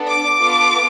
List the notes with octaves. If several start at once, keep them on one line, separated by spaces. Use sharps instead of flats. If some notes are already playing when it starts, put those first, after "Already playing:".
Already playing: B3 D4 A4
D6
B3 F4 A4